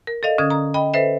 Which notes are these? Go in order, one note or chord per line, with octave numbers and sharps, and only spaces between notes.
A#4
A4 D5 D#5 F5
D3 C#4 D#6 G#6
A#5 D#6
D#5 G5 B5
A4 B4 C5 E5